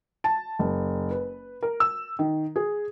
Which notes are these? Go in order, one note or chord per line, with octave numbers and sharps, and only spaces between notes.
A5
F#1
B4
A#4
E6
D#3
G#4